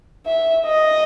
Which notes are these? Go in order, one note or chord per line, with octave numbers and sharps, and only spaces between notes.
E5
D#5